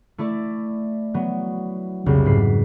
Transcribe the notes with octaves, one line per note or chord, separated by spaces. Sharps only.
A3 E4 D5
F#3 B3
C2 F2 C#3 F#3
G#2 B4 C7